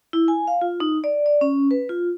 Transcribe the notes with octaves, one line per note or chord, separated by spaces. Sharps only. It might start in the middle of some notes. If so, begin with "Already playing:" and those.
E4
G#5
F5
F4
D#4
D5
D5
C#4
B4
F4